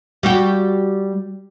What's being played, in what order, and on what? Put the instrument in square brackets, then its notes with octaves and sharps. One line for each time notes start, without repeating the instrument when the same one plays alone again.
[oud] G3 F#4 G4